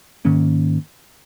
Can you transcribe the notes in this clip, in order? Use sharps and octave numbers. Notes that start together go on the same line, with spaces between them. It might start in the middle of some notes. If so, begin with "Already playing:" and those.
G#2 D#3 A#3 C#4